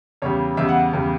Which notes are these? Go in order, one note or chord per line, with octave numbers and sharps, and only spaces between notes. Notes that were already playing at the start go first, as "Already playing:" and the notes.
E2 C#3 G3 C#5
E2 C#3 G3 E5
F#5
E2 C#3 G3